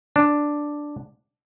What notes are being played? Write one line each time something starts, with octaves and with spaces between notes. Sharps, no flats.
D4